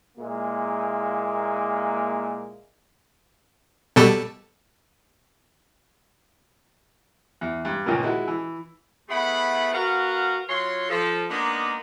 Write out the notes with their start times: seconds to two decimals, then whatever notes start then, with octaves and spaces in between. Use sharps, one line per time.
0.18 A#2 G#3 A#3 E4
3.96 B2 G3 A4
7.41 E2
7.65 G2
7.86 C#2 A#2 D#3 A#3
8.03 G#3 E4 F#4
8.28 E3
9.09 A3 B3 E4 G#4 F#5 B5
9.74 B3 F#4 A#4 F5 F#5
10.48 F#3 F4 C#5 C6
10.90 F3 A4
11.29 G#3 A#3 B3 D4 D#4